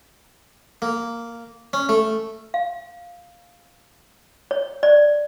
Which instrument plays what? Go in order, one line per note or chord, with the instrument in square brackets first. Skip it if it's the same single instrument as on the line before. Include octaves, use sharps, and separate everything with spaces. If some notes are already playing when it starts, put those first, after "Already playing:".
[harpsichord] A#3
C#4
A3
[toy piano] F5
C#5
D5